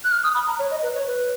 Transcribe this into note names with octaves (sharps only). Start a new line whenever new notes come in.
F#6
F6
D#6
B5
A#5
C#5
D#5
B4
C#5
B4